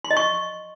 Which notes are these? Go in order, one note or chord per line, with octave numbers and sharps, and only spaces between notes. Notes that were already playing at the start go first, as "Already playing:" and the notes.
C6
D#5
C#6